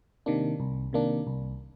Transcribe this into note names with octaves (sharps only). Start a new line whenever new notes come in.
C3 D#3 A#3 D4
C2
C3 D#3 A#3 D4
C2